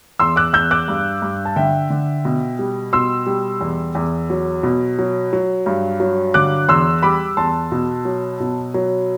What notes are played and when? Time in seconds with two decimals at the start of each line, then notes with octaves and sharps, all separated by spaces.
0.19 E2 C6 E6
0.36 D6 F#6
0.53 E2 E6 G6
0.71 D6 F#6
0.88 G2
1.22 G2
1.45 A5
1.56 D3 E5 G5
1.90 D3
2.25 B2
2.59 G3
2.93 B2 C6 E6
3.27 G3
3.61 E2
3.95 E2
4.30 F#3
4.63 B2
4.99 F#3
5.33 F#3
5.66 G2
6.00 F#3
6.34 D3 D6 F#6
6.69 E2 C6 E6
7.03 G3 B5 D6
7.37 E2 A5 C6
7.72 B2
8.05 F#3
8.40 B2
8.74 F#3